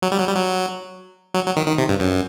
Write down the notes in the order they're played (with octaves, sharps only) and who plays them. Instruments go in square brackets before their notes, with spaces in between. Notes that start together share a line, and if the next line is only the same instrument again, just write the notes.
[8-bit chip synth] F#3
G3
F#3
G3
F#3
F#3
F#3
D#3
D#3
C3
G2
F#2